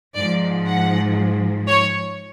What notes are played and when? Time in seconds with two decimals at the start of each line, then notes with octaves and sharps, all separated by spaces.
0.15 G#2 F3 D5
0.67 F#5
1.68 C#5